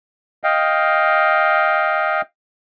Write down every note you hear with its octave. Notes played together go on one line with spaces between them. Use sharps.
D#5 F5 G5